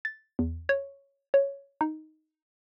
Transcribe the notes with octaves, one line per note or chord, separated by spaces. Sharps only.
A6
E2
C#5
C#5
D#4